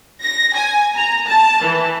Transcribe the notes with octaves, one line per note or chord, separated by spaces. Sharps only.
A#6
G#5
A#5
A5
E3